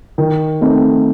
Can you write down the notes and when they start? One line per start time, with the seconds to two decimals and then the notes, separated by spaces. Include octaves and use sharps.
0.18 D#3
0.61 A3 C4 D#4